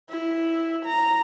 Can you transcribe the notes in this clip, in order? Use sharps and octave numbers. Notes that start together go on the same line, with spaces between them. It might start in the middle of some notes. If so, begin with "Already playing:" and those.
E4
A#5